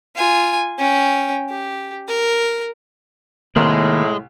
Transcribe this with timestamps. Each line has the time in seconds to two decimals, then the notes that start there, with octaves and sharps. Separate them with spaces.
0.16 F4 G#5
0.78 C#4 G5
1.50 G4
2.08 A#4
3.56 C2 A2 D#3 G#3 A#3 A#4 C6